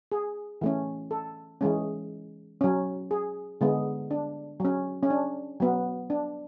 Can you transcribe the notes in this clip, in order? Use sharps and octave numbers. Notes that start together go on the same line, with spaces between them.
G#4
E3 A3 C#4
A4
E3 G#3 C#4
F#3 C#4
G#4
D3 G#3 B3
D4
F#3 C#4
C#4
D4
F#3 B3
D4